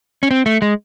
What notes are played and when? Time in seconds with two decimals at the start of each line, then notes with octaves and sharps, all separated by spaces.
0.23 C#4
0.31 C4
0.46 A3
0.62 G#3